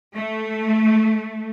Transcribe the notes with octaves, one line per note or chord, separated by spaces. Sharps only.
A3